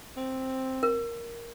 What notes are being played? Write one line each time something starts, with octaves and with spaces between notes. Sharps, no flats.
C4
A#4